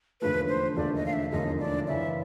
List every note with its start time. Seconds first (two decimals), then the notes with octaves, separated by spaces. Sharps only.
0.21 E1 D#2 D3 F3 A3 B4
0.49 C5
0.76 E1 D#2 D3 F3 A3 D5
0.96 D#5
1.06 F5
1.13 E5
1.32 E1 D#2 D3 F3 A3 D#5
1.60 D5
1.88 F#2 C#3 E3 E5